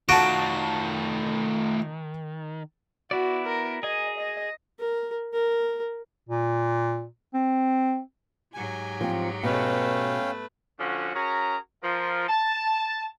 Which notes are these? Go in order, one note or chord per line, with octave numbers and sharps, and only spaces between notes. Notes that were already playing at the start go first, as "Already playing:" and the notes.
D#3 A3 F4 F#4 A5 D7
B3 E4 F#4 D5
A#4
G#4 D#5 G#5
D#5
A#4
A#4
A#2
C4
G#2 F#3 G4 G#5
F3 C4
B2 A3 C#4 B4 F5 G5
D3 F3 A3 C#4 F#4
C#4 F#4 G#4 A#4 A#5
F3 F4 A#4
A5